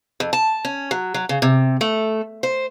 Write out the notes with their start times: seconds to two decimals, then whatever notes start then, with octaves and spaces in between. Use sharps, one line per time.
0.20 F2
0.33 A5
0.65 C#4
0.91 F#3
1.14 F#3
1.29 C#3
1.42 C3
1.81 A3
2.43 C5